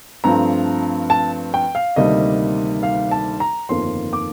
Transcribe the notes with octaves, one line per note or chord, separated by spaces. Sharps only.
G2 F3 A3 C4 A#5
A5
G5
F5
D2 C3 D#3 G3 A#3 D#5
F5
A5
A#5
G1 F2 D#3 A#3 C6
D6